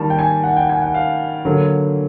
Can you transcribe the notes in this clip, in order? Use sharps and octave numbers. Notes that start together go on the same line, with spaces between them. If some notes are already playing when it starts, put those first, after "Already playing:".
Already playing: D#3 G3 A#3 A5
G5
G#5
F#5
G5
G#5
F#5
F5
D3 F#3 A#3